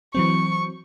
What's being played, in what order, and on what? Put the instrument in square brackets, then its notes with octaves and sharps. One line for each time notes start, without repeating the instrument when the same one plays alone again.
[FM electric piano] E3 F#3 C4 [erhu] C#6